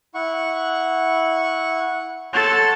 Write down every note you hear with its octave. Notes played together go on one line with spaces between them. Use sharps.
E4 F#5 C#6
A4 C#5 F#5 C6 A6